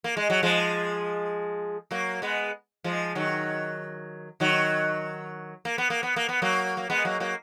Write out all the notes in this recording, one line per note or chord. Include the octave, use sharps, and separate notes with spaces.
A#3
G#3
F#3
F3 G#3
F#3 A#3
G#3 B3
F3 G#3
D#3 F#3
D#3 F#3
A#3
B3
A#3
B3
A#3
B3
F#3 A#3
A#3
G#3 B3
F#3 A#3
F#3 A#3